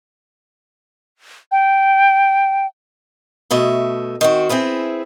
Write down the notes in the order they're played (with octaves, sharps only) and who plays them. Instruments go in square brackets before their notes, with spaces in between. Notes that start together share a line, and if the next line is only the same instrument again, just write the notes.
[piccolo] G5
[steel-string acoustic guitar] B2 A3 D#5 E5
D#3 C4 F#4
C4 E4 G#4 B4